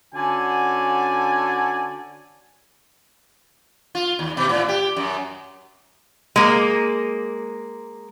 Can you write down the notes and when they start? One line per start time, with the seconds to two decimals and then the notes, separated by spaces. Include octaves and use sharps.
0.14 D3 C#4 F#4 D5 G#5
3.95 F4
4.19 D#2
4.37 B2
4.49 A2
4.68 G4
4.96 F#2
6.36 G#3 A#3